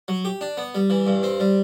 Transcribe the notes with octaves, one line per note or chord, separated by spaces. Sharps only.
F#3
G4
D4
B3
G3
E3
G2
C4
G3